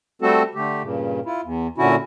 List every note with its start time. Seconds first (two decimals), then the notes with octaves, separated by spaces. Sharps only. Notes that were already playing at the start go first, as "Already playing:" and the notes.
0.22 G3 A3 C4 F#4 A4
0.55 D3 A3 G4
0.82 G2 A#2 C#3
1.25 E4 F4
1.44 E2
1.78 A#2 D3 C#4 E4 F#4